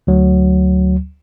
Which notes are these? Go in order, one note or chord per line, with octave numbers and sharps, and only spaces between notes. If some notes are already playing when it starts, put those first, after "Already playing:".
D2 F#3